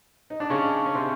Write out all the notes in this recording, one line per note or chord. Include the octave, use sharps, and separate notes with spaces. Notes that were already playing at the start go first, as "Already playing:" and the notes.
D#4
D4
C#3 C#4
C#4
C3 C4